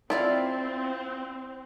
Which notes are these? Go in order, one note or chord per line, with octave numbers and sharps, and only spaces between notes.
C4 E4 F4 D5 F5